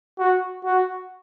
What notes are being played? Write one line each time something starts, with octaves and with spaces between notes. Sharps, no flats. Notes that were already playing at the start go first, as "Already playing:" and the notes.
F#4
F#4